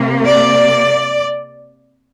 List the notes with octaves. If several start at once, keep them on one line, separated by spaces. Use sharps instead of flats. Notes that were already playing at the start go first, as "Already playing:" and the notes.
Already playing: C3 A#3
D5